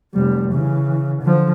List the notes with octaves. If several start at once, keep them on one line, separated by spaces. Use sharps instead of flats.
F1 G3
C#3 E3
D3 F3